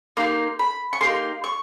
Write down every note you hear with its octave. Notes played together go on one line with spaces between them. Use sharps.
A#3 D#4 G4 C6
B5
C#6
A#3 D#4 G4 C6
C#6